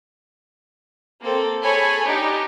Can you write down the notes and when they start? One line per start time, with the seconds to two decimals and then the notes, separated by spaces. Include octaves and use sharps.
1.22 A#3 C4 A4
1.62 G#4 A4 C#5 G#5 B5
2.04 D4 D#4 G4